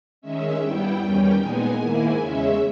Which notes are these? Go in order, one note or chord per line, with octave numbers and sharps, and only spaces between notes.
D#3 G#3 C#4 E5
G2 G3 B3 E4 G5
E2 D#3 G3 C#4
A#2 G#3 B3 D#4 G#5
G#2 D#3 A#3 E4
E2 C#3 G#3 C#4 E5